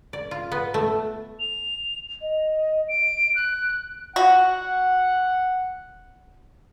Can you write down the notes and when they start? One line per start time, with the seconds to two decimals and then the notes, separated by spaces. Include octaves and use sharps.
0.13 D5
0.31 F4
0.52 B3
0.74 A3
1.40 F7
2.21 D#5
2.89 D7
3.35 F#6
4.16 F#4 F#5